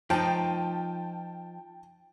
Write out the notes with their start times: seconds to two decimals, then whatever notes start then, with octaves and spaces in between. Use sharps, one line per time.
0.10 F3 D#4 G5 A5